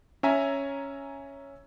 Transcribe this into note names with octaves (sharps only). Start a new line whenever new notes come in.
C#4 E5 G#5 A#5